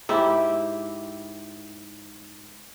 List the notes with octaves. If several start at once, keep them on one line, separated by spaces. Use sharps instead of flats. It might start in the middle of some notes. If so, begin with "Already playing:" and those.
G#2 E4 G4 E5